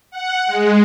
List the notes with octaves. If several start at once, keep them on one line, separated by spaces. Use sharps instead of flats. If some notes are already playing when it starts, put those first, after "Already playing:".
F#5
G#3